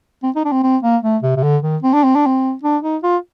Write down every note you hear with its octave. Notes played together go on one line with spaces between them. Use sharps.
C4
D#4
D4
C4
C4
A#3
A3
C3
C3
D3
D#3
C4
D4
C4
D4
C4
D4
D#4
F4